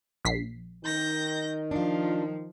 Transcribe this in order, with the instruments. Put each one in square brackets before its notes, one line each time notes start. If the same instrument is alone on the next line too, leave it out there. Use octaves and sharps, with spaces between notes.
[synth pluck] A#1 B6 C7
[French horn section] D#3 D#4 [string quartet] G6 A#6
[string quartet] F3 [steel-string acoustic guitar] D4 F4